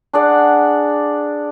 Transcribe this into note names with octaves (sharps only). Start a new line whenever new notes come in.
D4 G#4 D5 F#5